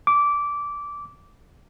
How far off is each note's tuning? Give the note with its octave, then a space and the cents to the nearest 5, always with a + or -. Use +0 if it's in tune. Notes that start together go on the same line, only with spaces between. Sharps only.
D6 -15